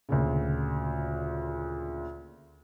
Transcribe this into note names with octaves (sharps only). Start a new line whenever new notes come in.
D2 A#2 C#3